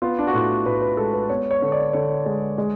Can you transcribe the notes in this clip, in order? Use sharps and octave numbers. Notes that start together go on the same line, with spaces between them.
B3 F4
D4
F#4
A2 F4
A2 B4
B4
G#3 A4
B4
B3 C#5
C#5
D3
D5
D3 C#5
G#3
G#3